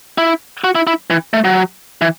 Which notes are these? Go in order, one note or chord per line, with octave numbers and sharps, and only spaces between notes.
E4
F#4
E4
E4
E3
A3
F#3
E3